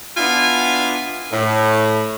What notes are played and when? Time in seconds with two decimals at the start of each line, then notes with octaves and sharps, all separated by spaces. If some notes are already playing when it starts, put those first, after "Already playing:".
0.17 B3 D4 E4 F4 G#5
1.31 A2